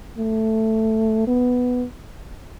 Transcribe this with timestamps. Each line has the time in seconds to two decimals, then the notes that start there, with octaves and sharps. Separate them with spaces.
0.18 A3
1.27 B3